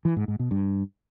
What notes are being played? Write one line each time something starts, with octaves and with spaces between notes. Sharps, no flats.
E3
G#2
G#2
B2
G2